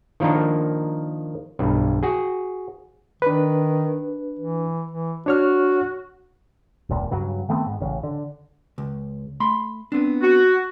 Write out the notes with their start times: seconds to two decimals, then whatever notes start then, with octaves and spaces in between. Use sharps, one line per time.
0.20 D#3 F3 A#3 D4 D#4
1.59 B1 G2
2.03 F#4 G#4
3.22 D#3 D4 B4
4.39 E3
4.91 E3
5.26 D4 F#4 C#5 F6
6.89 E1 C#2 A#2
7.11 G2 C#3 F#3
7.49 D#3 A3 B3 C4
7.66 G#2
7.80 A1 C#3
8.03 D3
8.78 C#2
9.40 A3 B5 C6
9.92 B3 C4 D4
10.22 F#4